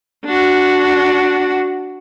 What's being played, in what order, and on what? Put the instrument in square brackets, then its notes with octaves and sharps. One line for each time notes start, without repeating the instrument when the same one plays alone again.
[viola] D4 F#4